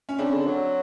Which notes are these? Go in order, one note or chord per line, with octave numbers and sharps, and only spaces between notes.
C#4
C#3 C4 D4
D3
F#3